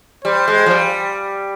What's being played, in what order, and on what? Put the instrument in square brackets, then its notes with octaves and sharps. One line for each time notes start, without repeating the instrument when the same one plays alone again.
[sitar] G3 [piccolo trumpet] C5
[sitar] G#3
F3
G3